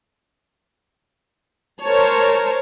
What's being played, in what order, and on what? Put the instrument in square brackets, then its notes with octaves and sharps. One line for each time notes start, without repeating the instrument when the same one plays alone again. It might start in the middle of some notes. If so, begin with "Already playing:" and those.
[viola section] A#4 C5 C#5 A5